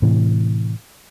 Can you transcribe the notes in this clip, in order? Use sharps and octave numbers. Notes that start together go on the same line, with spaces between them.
A2 C3 E3